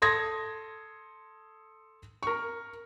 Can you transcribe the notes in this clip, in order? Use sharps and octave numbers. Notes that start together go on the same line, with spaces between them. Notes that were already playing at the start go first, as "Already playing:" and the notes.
A4 C6 D#6 G#6 A#6
A#4 C#6